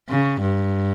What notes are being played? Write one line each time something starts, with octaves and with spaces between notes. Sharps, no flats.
C#3
G2